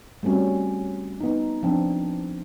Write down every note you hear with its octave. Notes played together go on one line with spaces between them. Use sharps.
G3 A3 C4 C#4 F#4
B3 D#4
F3 C4 D4